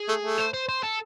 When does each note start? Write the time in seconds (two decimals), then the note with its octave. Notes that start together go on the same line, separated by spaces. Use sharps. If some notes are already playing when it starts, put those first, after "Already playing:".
Already playing: G#4
0.08 A3
0.23 A3
0.38 C5
0.54 C5
0.69 C5
0.83 A4